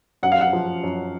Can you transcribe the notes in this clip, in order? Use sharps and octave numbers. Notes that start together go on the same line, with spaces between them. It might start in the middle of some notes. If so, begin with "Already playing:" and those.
F#2 F#5
F5
F#5
F3
F#2